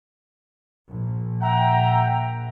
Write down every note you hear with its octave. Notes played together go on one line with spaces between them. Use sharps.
A#1
E5 F#5 G5 A#5